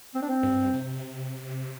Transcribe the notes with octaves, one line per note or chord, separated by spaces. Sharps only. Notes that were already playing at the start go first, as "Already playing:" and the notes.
C4
D4
C4
G2
C3